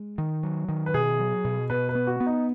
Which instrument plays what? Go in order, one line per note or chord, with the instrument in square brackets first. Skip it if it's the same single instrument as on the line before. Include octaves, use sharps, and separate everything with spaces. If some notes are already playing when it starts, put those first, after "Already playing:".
Already playing: [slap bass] G#3
D#3
F#3
D#3
[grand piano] B4
[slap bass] B2 [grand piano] G#4
[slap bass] F#3
B2
[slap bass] B2 [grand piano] B4
[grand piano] B4
[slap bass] B3
[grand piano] F#4
[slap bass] B3
[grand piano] D#4